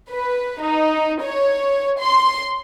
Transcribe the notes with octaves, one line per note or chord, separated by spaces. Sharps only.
B4
D#4
C#5
C6